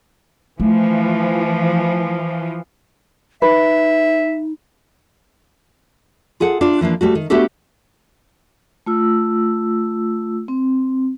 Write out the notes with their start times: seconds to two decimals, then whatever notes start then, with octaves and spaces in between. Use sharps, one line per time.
0.60 E3 F3 A3
3.42 D#4 B4 E5
6.40 F4 G#4 A4 F#5
6.61 D4 F4 D5
6.81 E3 F3 A#3 D4
7.01 G3 A3 F#4
7.15 D#3
7.30 A3 B3 D4 F#4 G4 A4
8.86 A3 F4 E6
10.48 C4